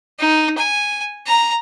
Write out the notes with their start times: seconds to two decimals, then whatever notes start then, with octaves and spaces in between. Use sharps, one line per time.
0.19 D#4
0.58 G#5
1.27 A#5